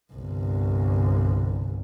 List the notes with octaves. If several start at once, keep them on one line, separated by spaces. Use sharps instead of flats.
G1 C2